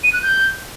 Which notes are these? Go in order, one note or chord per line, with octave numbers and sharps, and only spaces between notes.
D#7
F#6
G6